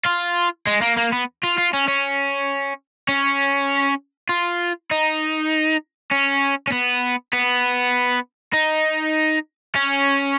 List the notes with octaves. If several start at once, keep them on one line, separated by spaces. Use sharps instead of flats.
F4
G#3
A#3
A#3
B3
F4
F4
C#4
C#4
C#4
F4
D#4
C#4
C#4
B3
B3
D#4
C#4